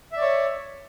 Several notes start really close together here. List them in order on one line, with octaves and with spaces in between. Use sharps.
E5 D5 C#5